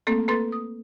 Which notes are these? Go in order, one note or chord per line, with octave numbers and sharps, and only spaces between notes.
A3 A#3 C4 A4
A#3 A4 B4 C6 A6
D#6